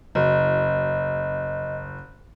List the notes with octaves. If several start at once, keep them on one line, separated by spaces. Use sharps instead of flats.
F#1 D#5